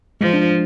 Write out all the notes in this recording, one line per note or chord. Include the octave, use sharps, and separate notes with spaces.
F3 G#3
D4